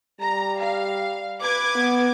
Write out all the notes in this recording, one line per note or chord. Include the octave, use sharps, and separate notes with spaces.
G3 A#5
F5
B4 D6 G#6
B3